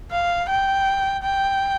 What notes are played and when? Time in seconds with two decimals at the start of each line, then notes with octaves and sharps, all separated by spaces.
0.11 F5
0.49 G5
1.23 G5